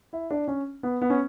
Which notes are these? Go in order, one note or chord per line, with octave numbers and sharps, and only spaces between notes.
E4
D4
C#4
B3
B3
C#4